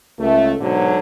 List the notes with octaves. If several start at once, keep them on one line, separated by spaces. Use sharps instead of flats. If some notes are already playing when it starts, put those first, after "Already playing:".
C#2 A3
G#2 B2 D3 F#3